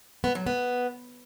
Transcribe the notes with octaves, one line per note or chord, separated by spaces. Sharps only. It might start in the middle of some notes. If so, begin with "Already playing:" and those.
B3
F#3
B3